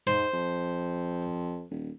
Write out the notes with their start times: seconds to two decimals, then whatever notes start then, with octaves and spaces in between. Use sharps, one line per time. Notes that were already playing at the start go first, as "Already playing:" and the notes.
0.07 G#2 C5
0.33 F2
1.71 D#1